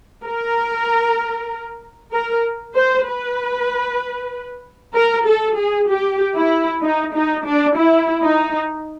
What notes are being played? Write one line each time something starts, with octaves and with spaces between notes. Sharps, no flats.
A#4
A#4
C5
B4
A#4
A4
G#4
G4
E4
D#4
D#4
D4
E4
D#4